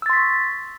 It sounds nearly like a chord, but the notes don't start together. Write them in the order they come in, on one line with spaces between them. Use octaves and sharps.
E6 A6 C6 B6 C#6